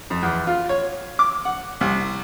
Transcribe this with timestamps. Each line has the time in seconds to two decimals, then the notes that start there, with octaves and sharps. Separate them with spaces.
0.10 F2
0.23 E2
0.47 F4
0.69 C#5
1.19 D6
1.45 F#5
1.81 C2